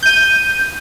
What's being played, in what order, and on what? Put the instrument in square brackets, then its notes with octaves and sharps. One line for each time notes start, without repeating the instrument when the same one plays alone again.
[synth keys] G6 D#7